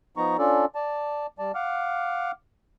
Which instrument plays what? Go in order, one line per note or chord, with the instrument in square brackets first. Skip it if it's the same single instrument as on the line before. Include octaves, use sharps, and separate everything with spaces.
[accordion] F3 B3 D#4 A#5 C#6
C#4 D4 F4 A4 D5
D5 A5
G3 D5 A5
F5 F#5 D6 F6